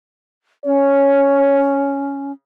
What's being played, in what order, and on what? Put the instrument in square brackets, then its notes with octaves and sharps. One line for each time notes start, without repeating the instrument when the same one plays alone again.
[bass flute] C#4 [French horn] C#5